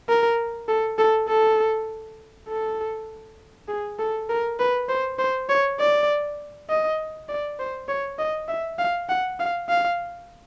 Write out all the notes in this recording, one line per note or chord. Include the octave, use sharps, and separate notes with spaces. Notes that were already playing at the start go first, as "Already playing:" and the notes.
A#4
A4
A4
A4
A4
G#4
A4
A#4
B4
C5
C5
C#5
D5
D#5
D5
C5
C#5
D#5
E5
F5
F#5
F5
F5